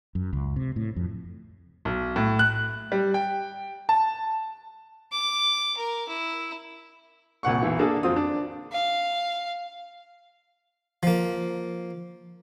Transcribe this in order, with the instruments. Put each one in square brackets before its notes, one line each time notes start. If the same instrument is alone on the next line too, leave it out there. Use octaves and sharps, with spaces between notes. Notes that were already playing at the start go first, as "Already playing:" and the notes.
[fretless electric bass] F#2
C#2
C3
A2
F2
[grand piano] B1
A2
F#6
G3
G5
A5
[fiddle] D6
A#4
E4
[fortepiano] C2 A#2 F#5 C#6
B1 E3
A#3 D4 G#4 A4
F2 C4 F4 D#6
D4
[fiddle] F5
[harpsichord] F3 A#3